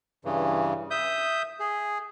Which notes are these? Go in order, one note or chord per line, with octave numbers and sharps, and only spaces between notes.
G2 C#3 E3
E5 D#6 G6
G#4